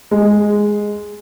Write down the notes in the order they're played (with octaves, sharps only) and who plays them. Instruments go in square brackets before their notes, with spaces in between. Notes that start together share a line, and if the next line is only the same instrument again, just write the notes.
[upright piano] G#3